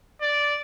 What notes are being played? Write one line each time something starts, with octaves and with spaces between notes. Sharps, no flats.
D5